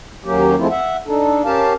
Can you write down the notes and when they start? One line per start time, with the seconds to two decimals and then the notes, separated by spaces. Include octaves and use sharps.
0.25 D#2 F#3 A#3 C#4 G4
0.58 F3 G#3 A3 C4 E4 F4
0.70 E5 F#5
1.07 D4 D#4 A4
1.45 C#4 G4 A#4 F5 A5